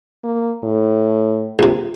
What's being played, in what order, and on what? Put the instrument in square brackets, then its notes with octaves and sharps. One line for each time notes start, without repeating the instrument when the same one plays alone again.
[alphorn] A#3
A2
[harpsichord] A#1 C3